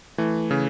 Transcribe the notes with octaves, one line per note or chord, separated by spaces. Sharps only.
E3 A3
C#3